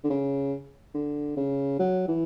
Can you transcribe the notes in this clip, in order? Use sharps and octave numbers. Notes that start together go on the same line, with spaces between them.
D3
C#3
D3
C#3
F#3
E3